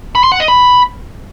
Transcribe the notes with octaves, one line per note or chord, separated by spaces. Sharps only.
B5
C6
F#5
D#5
B5